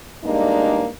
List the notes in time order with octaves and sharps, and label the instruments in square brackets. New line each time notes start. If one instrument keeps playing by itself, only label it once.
[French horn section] E2 G3 G#3 A#3 D4 D#4